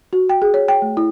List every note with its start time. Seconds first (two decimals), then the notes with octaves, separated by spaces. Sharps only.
0.13 F#4
0.29 G5
0.42 G#4
0.54 C#5
0.68 G5
0.82 A3
0.97 E4